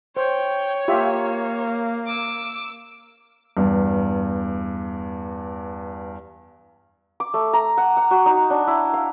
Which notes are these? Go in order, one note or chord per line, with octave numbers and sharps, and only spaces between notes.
C5 C#5 G5
A#3 F4 G4 E5
D6 E6
E2 G2
D6
A3
A#5
F#5
F#5
F#4
D#4
D4
E4
F5